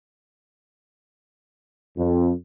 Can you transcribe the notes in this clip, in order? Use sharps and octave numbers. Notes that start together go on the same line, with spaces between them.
F2